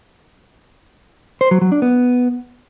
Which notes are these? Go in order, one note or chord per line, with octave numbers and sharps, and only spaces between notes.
C5
F#3
F#3
D4
B3